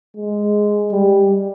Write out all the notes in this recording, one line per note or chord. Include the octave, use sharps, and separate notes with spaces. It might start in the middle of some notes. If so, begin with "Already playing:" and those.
G#3
G3